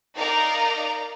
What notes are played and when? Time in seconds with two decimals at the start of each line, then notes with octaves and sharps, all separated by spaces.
0.17 D#4 A#4 D5 F5 A#5